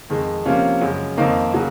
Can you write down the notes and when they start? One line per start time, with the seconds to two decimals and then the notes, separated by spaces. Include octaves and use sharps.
0.10 F2 D#3 G#3
0.46 C3 F3 A#3 C#4 F4
0.82 F#2 C#3 G#3
1.17 F2 D#3 A#3 C4 D#4
1.53 C#3 F#3 A#3